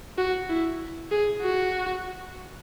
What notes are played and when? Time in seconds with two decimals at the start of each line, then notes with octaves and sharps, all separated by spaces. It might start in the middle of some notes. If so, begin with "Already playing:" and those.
0.18 F#4
0.50 E4
1.12 G#4
1.42 F#4